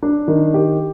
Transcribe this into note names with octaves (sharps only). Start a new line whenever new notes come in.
D4
D#3
G4